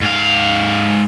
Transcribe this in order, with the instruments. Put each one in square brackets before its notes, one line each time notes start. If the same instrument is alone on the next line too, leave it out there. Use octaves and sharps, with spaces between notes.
[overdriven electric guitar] G#2 F5